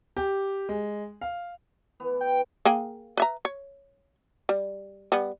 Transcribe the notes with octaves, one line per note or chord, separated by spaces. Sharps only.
G4
G#3
F5
E3 B3
G5
A#3 G#4 G5
B4 E5 A#5
C#5
G3
G3 B3